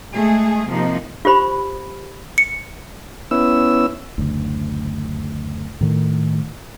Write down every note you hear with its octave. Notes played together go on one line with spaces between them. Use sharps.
G#3 A3 G#4
C3 F3 A#3 D#4
F4 G4 C5 B5
C#7
B3 C#4 E4 E6
F#1 D2
A2 D#3 A3